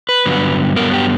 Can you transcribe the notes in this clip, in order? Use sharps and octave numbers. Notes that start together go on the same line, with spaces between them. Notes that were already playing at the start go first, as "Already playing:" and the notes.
B4
G2 D3 F#3 B3
G2 D3 F#3 B3 A#4
G4